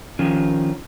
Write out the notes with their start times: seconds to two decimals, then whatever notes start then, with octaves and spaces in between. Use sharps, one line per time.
0.19 D#3 F3 C#4